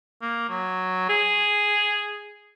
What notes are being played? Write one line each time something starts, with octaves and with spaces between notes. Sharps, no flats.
A#3
F#3
G#4